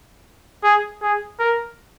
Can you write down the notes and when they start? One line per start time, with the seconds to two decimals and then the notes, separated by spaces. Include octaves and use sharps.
0.64 G#4
1.02 G#4
1.40 A#4